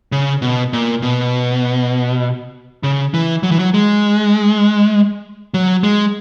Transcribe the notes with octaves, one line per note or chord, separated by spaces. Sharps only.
C#3
B2
A#2
B2
C#3
E3
F#3
E3
F#3
G#3
F#3
G#3